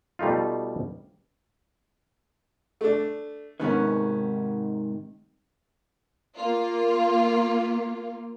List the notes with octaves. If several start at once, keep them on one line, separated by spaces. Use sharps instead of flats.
B2 G3 A3 D#4 F4
A3 D4
G#2 C3 D#3 B3 C#4 B4
A#3 F4